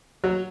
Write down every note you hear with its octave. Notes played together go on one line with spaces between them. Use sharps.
F#3